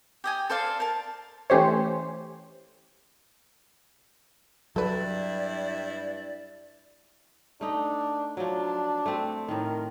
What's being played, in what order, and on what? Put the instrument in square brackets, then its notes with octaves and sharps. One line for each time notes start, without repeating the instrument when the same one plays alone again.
[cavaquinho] G4 D#5 G#5
A4 C5 D5 F5
A#4 A5
[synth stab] E3 A3 C#4 G4 C5 C#5
[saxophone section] G2 E4 [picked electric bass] F#3 [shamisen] A4 B4 [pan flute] D5
[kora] A3 D#4 [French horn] D4
[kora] F3 F#3 [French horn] D4
[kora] A3 C4
[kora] A2 D#3 [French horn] A#4